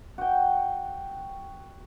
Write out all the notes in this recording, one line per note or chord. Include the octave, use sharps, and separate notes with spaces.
F#4 G5